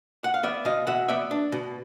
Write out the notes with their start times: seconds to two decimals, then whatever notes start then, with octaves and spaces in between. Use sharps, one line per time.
0.24 F#5
0.34 F5
0.43 B3 D5 E5
0.65 B2 D#5 F5
0.87 B2 E5 F#5
1.08 B3 D5 E5
1.31 D4
1.52 B2